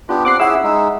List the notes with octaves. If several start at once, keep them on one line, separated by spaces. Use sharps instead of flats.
B3 D4 F4 G4
C4 F#5 D6 F#6 C7
C#4 E4 G#4 E5 F#5 E6
G#3 D#4